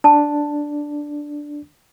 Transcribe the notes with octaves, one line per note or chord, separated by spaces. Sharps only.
D4 A5